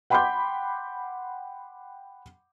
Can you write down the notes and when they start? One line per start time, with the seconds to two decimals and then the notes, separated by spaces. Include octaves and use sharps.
0.10 F#5 G5 B5 C6 D6 G6